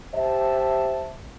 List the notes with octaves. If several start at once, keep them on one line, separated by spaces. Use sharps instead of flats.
G4 C5 E5 A5